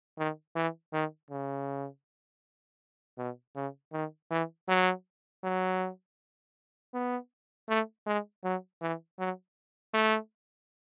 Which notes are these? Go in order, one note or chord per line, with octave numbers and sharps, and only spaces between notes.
D#3
E3
D#3
C#3
B2
C#3
D#3
E3
F#3
F#3
B3
A3
G#3
F#3
E3
F#3
A3